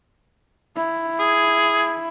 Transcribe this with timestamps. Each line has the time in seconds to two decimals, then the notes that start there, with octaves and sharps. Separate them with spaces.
0.76 E4
1.19 G#4